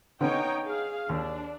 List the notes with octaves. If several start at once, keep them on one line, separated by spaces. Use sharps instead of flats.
D3 B3 C#4 D#4 C#5 G5
G#4 F5
D#2 D4